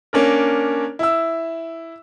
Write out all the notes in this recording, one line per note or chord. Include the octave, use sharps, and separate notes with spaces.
A#3 C#4 D4 A#4
E4 E6